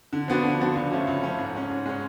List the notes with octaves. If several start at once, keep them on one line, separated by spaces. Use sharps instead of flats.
D3
F3 B3 D4 F#4
D3
F3 B3 D4 F#4
C#2
C#3 F3 A3 C#4
C#2
C#3 F3 A3 C#4
G#2
G#3 C#4
G#2
G#3 C#4